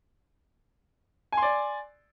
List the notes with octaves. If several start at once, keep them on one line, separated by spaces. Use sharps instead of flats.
D5 G#5 C6